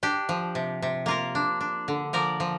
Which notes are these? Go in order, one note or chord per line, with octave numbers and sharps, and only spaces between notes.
D4 G4
F3
C3
C3
A#3 F4 A#4
D4
D4
D3
F3 A#4 D5
F3